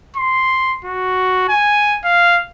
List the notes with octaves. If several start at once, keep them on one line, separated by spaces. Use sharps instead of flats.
C6
F#4
G#5
F5